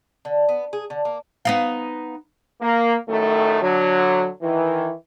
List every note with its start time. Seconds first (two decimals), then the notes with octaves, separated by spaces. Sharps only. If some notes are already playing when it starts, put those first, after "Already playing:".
0.25 D3
0.49 B3
0.73 G#4
0.90 D3
1.05 A#3
1.45 B3 D#4 F5
2.62 A#3
3.09 F#2 A2 D#3 A3
3.62 D3 F#3
4.41 D#3 E3